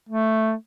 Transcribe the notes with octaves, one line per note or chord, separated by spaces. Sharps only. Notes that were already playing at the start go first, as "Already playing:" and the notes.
A3